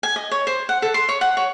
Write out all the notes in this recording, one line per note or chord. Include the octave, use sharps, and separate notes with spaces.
G#5
D#5
C#5
C5
F#5
A4
C6
C#5
F#5
C#5